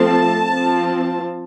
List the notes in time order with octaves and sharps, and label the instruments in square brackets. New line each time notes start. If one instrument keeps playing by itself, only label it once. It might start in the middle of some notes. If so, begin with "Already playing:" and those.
Already playing: [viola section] F3 A3 C4 A5
F3 C4